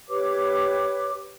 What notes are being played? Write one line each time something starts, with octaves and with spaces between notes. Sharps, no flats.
G4 B4 C#5 D6